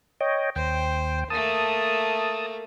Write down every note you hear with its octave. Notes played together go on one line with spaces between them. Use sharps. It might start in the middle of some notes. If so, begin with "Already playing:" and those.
C#5 D#5 G5
D#2 C5 G5
A3 A#3 A5 D#6